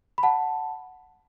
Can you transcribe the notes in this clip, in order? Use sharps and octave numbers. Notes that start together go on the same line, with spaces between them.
B5
F#5 A5